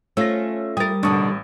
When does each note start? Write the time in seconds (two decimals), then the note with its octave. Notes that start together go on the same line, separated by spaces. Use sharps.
0.17 A3 C#4 F4 E6 A#6
0.77 G3 A#4 D#6 A6
1.03 A1 B2 D3 D4 C#6 D#6